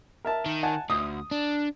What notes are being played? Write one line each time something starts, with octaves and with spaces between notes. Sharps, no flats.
A#4 E5 A5
D#3
F#5 G#5 A5
D2 D#6
D4